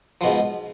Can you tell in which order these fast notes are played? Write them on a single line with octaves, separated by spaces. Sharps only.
F3 B2 G#2